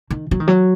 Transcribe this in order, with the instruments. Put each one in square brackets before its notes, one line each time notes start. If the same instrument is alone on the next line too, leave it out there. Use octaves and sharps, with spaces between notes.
[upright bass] D#3
F#3
D#3
F#3